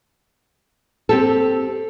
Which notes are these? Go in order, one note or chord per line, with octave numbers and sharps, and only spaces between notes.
C4 G4 A4